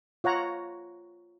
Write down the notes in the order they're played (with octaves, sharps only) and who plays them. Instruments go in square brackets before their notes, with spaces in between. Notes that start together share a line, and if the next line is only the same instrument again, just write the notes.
[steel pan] F4 C#5 F#5 A#5